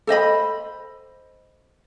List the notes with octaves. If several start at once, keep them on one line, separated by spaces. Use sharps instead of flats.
A4 C5 D#5 B5